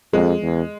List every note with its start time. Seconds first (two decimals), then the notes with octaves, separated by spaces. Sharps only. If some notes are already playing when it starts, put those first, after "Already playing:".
0.13 F2 G#3
0.41 E2